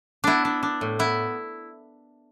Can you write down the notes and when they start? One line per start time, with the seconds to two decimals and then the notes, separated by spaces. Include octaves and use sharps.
0.24 B3 D4 E4
0.45 D4
0.63 D4
0.81 A2
0.99 B3 E4